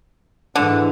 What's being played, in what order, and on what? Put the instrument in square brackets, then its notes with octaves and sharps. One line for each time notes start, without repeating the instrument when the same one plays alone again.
[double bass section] G#2 E3 [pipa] D3